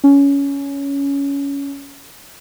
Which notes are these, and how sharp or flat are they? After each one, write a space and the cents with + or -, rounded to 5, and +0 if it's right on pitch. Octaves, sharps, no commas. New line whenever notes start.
C#4 +15